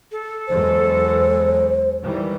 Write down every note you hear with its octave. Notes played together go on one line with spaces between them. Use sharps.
A4
E2 F#3 G#3 C5
D#3 E3 G3